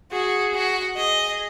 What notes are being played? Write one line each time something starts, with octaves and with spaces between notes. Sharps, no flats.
F#4 G#4
F#4
G#4 D#5